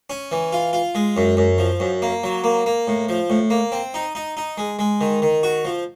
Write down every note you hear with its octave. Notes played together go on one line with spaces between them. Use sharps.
C#4
E3
F4
F4
G#3
F#2
F#2
F3
F#2
A#3
F#3
A#3
A#3
A2
F3
A2
A#3
C4
D#4
D#4
D#4
G#3
G#3
D#3
D#3
F#4
F3